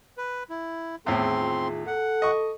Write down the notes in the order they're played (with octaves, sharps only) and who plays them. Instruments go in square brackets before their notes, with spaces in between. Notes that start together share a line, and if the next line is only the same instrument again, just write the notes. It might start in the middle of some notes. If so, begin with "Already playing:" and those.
[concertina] B4
E4
[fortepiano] E2 A2 [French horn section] D#3 F4 G#4 [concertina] C4 C6
[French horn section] A4 [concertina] F#5
[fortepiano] D#5 C#6